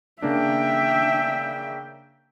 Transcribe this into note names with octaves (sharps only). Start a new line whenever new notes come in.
C#3 A#3 D4 E5 G5